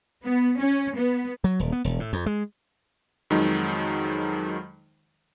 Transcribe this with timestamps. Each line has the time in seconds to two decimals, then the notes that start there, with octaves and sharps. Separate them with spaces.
0.24 B3
0.59 C#4
0.94 B3
1.44 F#3
1.60 D#1
1.72 B3
1.84 E1
2.00 A2
2.13 F2
2.26 G#3
3.30 F2 D#3 F#3 G#3 D#4